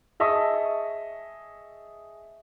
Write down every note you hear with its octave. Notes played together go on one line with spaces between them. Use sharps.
G#4 D#5 E5 A5 C#6 D#6